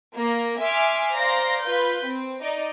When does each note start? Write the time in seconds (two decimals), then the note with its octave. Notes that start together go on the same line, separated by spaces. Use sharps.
0.16 A#3
0.59 E5 G#5 C6 D6 F6
1.13 C5 D5 F5 A#5 C6 A#6
1.61 F4 B4 G6
2.05 C4
2.41 D#4 D5 D#5